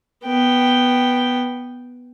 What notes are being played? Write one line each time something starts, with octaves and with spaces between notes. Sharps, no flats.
B3 G5